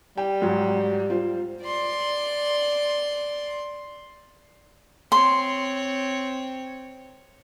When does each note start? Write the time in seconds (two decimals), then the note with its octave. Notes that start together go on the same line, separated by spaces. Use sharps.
0.17 G3 G5
0.42 G#2 F#3
1.10 F4 C5
1.63 D5 C6
5.12 C4 C#5 C6